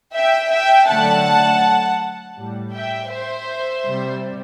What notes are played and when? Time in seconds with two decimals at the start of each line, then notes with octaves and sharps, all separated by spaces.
0.15 E5 G5
0.52 E5 G5
0.88 D3 F#3 A3 F#5 A5
2.37 A2 G3
2.74 E5 G5
3.11 C5 E5
3.85 C3 G3